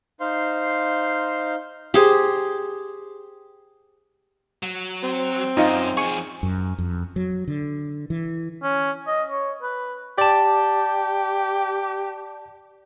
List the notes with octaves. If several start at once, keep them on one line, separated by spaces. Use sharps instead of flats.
D#4 C5 F5 C6
G4 G#4 C5
F#3
C4
F#2 D#4 F4 D#5
F3 G#4 C#6
F#2
F2
F#3
D3
E3
C#4
D#5
C#5
B4
G4 D5 A5